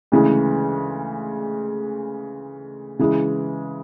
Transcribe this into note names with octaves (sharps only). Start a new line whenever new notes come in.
D2 C#3 E3 G#3
C#3 E3 G#3